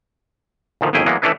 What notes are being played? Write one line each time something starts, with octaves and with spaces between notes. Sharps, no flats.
D2 A#2 D#3 F3
G1 F2 D#3 E4 G#4 G5
E3 F#3 G#3 A#3 B3
E3 A3 C#4 D4 E4 B4